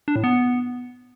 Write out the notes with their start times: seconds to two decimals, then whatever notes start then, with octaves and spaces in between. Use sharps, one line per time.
0.08 D4
0.16 A2
0.24 B3